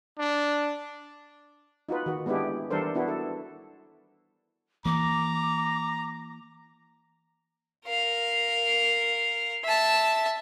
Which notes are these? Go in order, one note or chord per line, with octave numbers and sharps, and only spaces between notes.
D4
D#4 F4 F#4 B4
D#3 F#4
G#3 B3 D4 E4 G4
E3 G3 D4 A4 A#4 C5
B3 D4 E4 F#4
A4
E3 A#3 A#5 D6
A#4 F5
E5 A5